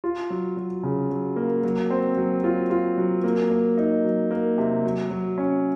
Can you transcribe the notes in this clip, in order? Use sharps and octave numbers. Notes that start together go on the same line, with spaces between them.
F4
F#3
F#3
C#3
F#3
A#3
F#3
C4
F#3
F4
F4
F#3
A#3
A#3
D#4
F#3
A#3
C3
F#3
F#3
C#4